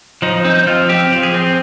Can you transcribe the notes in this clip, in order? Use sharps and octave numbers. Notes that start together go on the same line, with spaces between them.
F3 D#4
C4 D#4
F3 F4
C4 G4
F3
G#4
C4